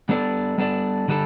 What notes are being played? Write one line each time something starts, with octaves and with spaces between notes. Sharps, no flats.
G3 B3 D4 A4 D5
G3 B3 D4 A4 D5
D3 G3 D4 A4